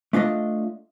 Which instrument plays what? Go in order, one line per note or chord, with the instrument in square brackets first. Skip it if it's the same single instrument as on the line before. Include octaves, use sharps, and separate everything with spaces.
[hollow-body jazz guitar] A3 D4 F4 D#5